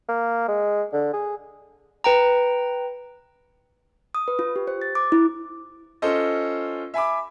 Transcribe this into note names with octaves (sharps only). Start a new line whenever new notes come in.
A#3
G#3
D3
G#4
B4 G5 A#5
D#6
B4
F4
G4
C5
A6
D6
E4
C#4 F4 A4 C5 D#5
E5 G#5 B5 D6